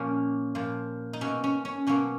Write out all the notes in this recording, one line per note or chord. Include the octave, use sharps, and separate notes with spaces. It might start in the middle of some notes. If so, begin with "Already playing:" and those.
Already playing: A#2 F3 A#3 C#4
A#2 F3 A#3
D#4
B2 F#3 A#3 C#4
C#4
C#4
B2 F#3 A#3 C#4